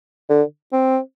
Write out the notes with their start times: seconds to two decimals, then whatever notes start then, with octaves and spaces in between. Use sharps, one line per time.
0.29 D3
0.72 C4